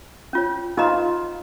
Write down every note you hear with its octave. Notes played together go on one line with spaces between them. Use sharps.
C#4 F4 C#5
D#4 F4 A#4 D#5 A#5